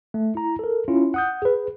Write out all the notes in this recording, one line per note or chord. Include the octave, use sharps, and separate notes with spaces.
A3
E4 A#5
A4 A#4
C#4 E4 F4
F#5 D#6 G6
G#4 B4